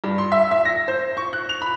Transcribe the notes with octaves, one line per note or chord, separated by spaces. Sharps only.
G2
C6
E5
E5
A#6
C5
C#6
F#6
F7
B5